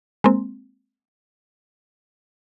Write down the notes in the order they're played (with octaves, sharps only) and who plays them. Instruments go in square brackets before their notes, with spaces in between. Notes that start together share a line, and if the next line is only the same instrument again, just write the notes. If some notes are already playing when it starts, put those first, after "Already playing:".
[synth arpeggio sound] G#3 A#3 C4